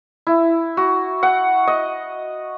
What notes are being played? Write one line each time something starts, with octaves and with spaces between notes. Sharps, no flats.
E4
F#4
F#5
D#5